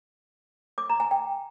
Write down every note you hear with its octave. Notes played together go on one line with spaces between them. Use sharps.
D6
A#5
G#5
G5